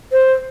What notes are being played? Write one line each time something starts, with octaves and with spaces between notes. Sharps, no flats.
C5